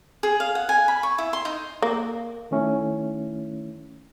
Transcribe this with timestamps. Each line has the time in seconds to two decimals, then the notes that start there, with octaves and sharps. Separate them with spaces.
0.23 G#4
0.40 F5
0.55 F#5
0.69 G#5
0.88 B5
1.03 C#6
1.18 E4
1.33 C6
1.45 D#4
1.82 A#3
2.51 D#3 A3 C#4 E4